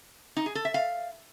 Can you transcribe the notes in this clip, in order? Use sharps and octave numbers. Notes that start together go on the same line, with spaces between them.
D#4
G#4
A4
E5
F5